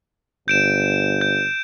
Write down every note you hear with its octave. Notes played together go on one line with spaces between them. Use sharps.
G1 G6 D7 E7
G6